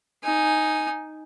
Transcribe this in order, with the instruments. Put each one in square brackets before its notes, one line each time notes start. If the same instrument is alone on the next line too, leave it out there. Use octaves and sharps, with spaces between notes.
[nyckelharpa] D#4 G#5